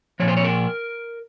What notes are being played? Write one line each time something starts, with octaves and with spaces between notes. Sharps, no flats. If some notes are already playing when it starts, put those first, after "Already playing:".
A#2 F3 C#5
C5
C#5
A#4